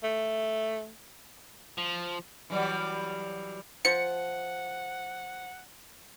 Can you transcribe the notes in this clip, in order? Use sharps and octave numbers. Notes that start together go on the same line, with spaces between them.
A3
F3
E3 F#3 G3
F3 F#5 C#7